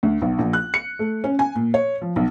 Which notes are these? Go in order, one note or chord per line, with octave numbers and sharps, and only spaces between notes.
D2
B1
A#1
F#6
C#7
A3
C#4
G#5
A#2
C#5
F3
B1